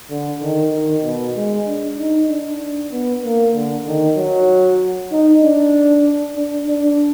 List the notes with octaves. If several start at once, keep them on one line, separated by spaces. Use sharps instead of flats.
D3
D#3
D#3
B2
G#3
D4
D#4
D4
B3
A#3
D3
D#3
F#3
D#4
D4
D4
D4